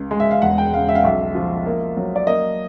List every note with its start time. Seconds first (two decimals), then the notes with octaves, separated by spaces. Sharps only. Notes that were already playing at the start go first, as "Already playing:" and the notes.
Already playing: C#2
0.11 G#3
0.20 E5
0.31 F5
0.42 E1 F#5
0.58 G5
0.73 C#3 F5
0.89 E5
0.95 F5
1.03 B1 E5
1.35 F3
1.66 A#3
1.97 F#3
2.16 D5
2.27 A#3 D#5